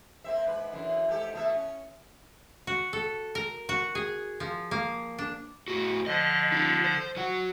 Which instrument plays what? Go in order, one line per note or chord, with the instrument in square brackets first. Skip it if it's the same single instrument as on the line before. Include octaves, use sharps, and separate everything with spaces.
[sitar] A#3 C4 E5
G#2 B4
F#2 D3 E3
G#2 G4 A4
B2 A3 E5
C#4
[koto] F#4
A4
A#4
F#4
G#4
F3
A#3
D4
[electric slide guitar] A2 F#4
[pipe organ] D3 F3 [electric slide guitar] D#5
[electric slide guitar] D#4 F4
C5
F#3 F#4 F#5